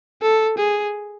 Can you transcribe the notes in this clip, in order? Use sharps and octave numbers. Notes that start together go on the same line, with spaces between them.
A4
G#4